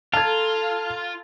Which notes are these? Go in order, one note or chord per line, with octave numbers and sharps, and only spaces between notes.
F4 A4 F5 A5 A#5 G#6